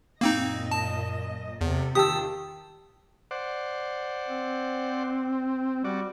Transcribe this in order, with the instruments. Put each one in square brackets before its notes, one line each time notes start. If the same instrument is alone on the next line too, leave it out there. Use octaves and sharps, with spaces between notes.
[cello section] F#2 A#2 D#5 [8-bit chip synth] A#3 C4 D#4
[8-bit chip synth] A5
[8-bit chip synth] E2 [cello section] C3 A4
[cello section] D#3 F4 [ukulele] G4 A5 [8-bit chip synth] D#6 E6
[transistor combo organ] C5 D5 F#5
[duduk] C4
[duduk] G3 [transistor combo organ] F#4 D5